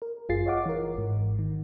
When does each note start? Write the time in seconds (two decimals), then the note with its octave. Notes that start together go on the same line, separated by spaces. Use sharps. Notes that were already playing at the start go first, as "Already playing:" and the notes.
0.02 A#4
0.29 G1 F#2 F4 G#4 A6 C7
0.46 C#5 D#5 F5 F#5 D6
0.66 E3 A#4
0.95 G#1 G#2
1.39 D#3